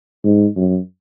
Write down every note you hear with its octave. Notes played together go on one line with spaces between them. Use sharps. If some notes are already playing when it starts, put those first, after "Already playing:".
G#2
F#2